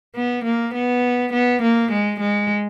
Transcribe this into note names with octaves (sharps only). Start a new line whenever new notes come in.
B3
A#3
B3
B3
A#3
G#3
G#3